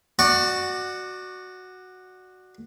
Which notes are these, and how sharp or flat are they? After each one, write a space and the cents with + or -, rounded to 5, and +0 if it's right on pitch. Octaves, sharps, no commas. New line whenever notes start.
F#4 +0 D5 +25 C#6 +0